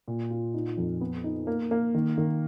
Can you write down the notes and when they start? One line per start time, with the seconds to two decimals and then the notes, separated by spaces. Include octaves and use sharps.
0.08 A#2
0.30 F4
0.54 D#4
0.77 F2
1.01 B3
1.24 D#4
1.47 A#3
1.71 A#3
1.94 D#3
2.18 D#3